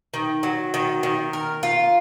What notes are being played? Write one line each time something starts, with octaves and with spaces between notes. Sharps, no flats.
D#3
F#3
D#3
D#3
A#4
F4